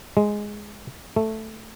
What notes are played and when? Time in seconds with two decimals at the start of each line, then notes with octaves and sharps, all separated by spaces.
0.17 G#3
1.16 A3